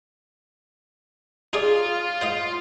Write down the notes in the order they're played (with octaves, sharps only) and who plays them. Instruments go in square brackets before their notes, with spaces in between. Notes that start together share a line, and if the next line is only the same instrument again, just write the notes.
[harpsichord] D#4 G#4 D5 [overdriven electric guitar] F4
[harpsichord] C5 D#5 F5